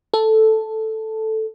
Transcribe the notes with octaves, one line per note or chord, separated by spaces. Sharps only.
A4